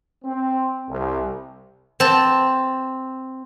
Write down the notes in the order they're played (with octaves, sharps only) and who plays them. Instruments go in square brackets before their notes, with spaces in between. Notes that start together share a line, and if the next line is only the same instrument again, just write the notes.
[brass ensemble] C4
C2
[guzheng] C4 A5